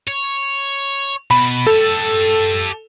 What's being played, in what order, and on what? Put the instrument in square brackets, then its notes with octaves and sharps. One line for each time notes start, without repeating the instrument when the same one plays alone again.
[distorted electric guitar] C#5
[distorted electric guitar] B2 [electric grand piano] B5
[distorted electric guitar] G4 A5 [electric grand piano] A4